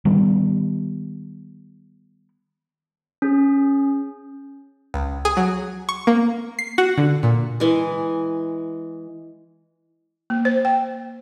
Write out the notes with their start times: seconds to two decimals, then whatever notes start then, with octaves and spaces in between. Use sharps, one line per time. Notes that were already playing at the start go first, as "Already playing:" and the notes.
0.05 D#3 G3 B3
3.22 C#4 G#4
4.94 C#2
5.25 G#4
5.37 F#3
5.89 C#6
6.07 A#3
6.59 C7
6.78 F#4
6.98 D3
7.23 A#2
7.60 E3 G#3
10.30 A#3
10.45 C5
10.65 G5